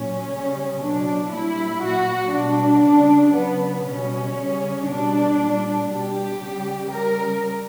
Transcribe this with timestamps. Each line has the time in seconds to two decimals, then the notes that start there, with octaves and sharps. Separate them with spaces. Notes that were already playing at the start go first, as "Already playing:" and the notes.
Already playing: A#2 F#3 C#4
0.31 C#3 G3
0.81 B2 F#3 D4
1.32 A#2 G3 E4
1.83 A#2 F#3 F#4
2.33 B2 G3 D4
2.84 C#3 G3
3.35 C#3 F#3 B3
3.85 B2 G3 C#4
4.36 C#3 G3
4.87 B2 G3 D4
5.38 A#2 G3
5.89 B2 G3 G4
6.40 C#3 G3
6.90 C#3 G3 A#4